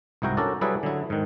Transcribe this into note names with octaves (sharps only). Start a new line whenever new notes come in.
C2 G#2 E4 F#4 G5 A#5
C#4 D4 F#4 A4 A#4 D5
F#3 G3 E4 G#4 A4 B4
D3 F#3 E4
G#2 D#3